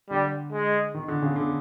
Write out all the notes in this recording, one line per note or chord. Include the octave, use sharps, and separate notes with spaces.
D3 G3
G#3
D#3
D3
C#3
D3